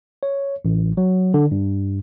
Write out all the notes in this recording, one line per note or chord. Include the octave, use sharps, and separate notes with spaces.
C#5
A1
F#3
D3
G2